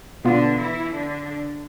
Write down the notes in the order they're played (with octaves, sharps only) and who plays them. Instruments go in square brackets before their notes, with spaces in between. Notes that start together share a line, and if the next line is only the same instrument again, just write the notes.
[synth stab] B2 B3 F4 [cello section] D3 D4
[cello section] E3 E4
D3 D4